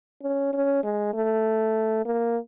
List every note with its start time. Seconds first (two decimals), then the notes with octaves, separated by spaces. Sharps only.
0.22 C#4
0.53 C#4
0.84 G#3
1.14 A3
2.05 A#3